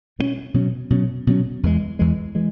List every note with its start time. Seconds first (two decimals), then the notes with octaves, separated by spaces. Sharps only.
0.19 B2 F#3 C#4
0.54 B2 F#3 C#4
0.90 B2 F#3 C#4
1.27 B2 F#3 C#4
1.63 E2 E3 G#3
1.99 E2 E3 G#3
2.35 E3 G#3